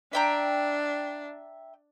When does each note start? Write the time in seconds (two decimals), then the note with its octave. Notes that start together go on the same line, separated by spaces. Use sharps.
0.13 D4 E5 G5 A#5